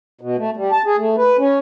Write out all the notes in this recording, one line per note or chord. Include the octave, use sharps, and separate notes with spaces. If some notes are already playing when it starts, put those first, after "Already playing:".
B2
A3
G3
A5
G#4
A3
B4
C#4